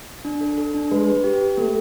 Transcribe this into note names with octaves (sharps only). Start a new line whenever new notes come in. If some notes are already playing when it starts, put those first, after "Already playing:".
D4
A4
A4
D4
G#3 B4
B4
G4
G4
A3 A#3